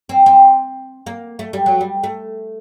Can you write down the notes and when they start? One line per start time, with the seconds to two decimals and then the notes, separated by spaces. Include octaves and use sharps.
0.09 C4
0.26 C4
1.06 A#3
1.39 A3
1.53 G3
1.66 F#3
1.81 G3
2.04 A3